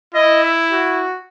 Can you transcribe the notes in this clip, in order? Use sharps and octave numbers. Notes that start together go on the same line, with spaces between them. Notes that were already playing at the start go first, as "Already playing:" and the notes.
E4 D#5
E5
F#4